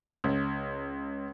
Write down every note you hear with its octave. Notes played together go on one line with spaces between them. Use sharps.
C#2